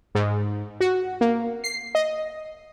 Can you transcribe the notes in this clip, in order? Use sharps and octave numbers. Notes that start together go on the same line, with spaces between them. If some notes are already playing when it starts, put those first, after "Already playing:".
G#2
F#4
A#3
C7
D#5